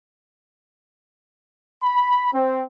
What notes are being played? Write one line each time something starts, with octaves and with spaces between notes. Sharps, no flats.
B5
C4